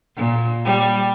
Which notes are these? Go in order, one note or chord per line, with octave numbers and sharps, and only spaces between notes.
A#2
G3